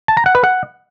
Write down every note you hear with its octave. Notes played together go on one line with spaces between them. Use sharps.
A5
A#5
F#5
B4
F#5